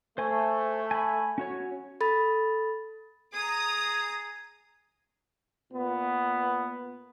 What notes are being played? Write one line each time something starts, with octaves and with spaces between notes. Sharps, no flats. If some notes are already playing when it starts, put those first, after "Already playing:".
A3 C5 G#5
G#5 B5
C#4 F#4 C#5
A4 B5 A6
G#4 A#5 D#6
A#2 B3